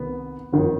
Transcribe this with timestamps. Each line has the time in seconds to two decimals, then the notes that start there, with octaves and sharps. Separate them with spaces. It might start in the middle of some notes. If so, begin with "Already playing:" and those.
Already playing: C2 C3 D#3 B3
0.53 G1 F2 D#3